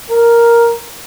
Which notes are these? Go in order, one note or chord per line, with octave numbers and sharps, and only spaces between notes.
A#4